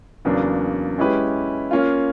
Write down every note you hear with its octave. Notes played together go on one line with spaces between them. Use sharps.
E2 C#3 F#3 A#3 D4
G#3 C#4 E4 G4 B4
A#3 C#4 F4